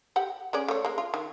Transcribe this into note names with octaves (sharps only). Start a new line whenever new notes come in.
G4 F#5
G#3 C#4 D5
A3 C#5
G#3 A#3
F4
D#3